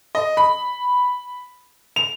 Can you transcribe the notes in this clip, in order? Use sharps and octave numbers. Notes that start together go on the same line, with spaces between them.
D#5
B5
F7